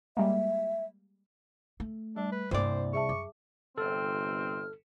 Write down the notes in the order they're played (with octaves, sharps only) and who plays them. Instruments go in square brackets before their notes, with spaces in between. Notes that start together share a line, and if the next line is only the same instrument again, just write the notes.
[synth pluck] G3 G#3 A#3 [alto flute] E5
[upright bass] A3
[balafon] G3 [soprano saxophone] D4
[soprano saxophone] B4
[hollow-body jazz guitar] C2 D5 [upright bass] G2 A#3 [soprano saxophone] C5
[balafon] G#4 E5 A5 [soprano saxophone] C#6
[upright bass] F#2 [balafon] D6
[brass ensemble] G1 C3 [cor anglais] C4 [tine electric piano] A4 [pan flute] F6